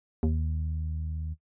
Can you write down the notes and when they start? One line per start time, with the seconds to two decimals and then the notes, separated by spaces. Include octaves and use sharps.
0.23 D#2